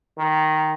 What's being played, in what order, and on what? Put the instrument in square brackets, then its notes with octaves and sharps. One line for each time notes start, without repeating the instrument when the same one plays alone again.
[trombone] D#3